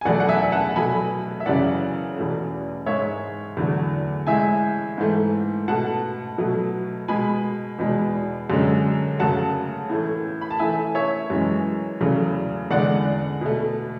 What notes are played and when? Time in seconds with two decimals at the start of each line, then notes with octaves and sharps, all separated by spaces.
0.01 G#5
0.05 E2 B2 F#3 A3 D5 F#5
0.20 F#5
0.29 E5 G#5
0.52 F#5 A5
0.76 B2 F#3 A3 G#5 B5
1.40 E5
1.46 F#2 C#3 E3 D5 F#5
2.16 E2 B2 A3
2.86 G#2 G#3 C#5 E5
3.57 E2 D3 F#3 A3
4.27 A2 G#3 E5 G#5
4.98 G#2 E3 A3
5.68 B2 A3 F#5 A5
6.38 B2 F#3 A3
7.08 B2 G#3 G#5 B5
7.79 E2 B2 G#3
8.50 F#2 D3 G#3
9.19 F#2 C#3 F#3 A3 F#5 A5
9.90 A2 E3 A3
10.41 B5
10.51 A5
10.60 A2 E3 A3 E5 G#5
10.95 C#5 E5
11.30 F#2 E3 G#3
12.01 E2 C#3 F#3 A3
12.71 E2 D3 G#3 D5 F#5
13.41 B2 A3